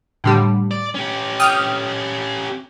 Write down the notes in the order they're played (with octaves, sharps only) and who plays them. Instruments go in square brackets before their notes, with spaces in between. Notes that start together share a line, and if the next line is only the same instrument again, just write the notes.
[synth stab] A2 D3 G3
[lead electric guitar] D5
C#4 G4
[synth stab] G5 D#6 F6